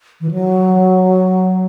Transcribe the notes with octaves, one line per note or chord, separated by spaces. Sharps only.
E3
F#3